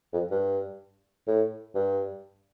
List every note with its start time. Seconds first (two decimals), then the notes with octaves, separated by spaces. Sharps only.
0.13 F2
0.31 G2
1.27 A2
1.75 G2